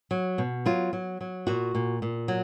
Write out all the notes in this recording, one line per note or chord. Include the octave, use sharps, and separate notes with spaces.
F#3
B2
F#3 F4
F#3
F#3
A#2 F#4
A#2
A#2
F#3